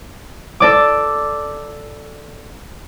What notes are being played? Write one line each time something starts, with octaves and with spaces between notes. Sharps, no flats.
A4 D5 D6